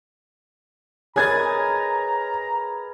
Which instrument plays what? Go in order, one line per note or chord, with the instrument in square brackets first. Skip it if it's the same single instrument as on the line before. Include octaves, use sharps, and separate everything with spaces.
[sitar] G#4 [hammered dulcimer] A#4 B4 D#5 [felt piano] C#5 G#6 A6 [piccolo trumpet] A#5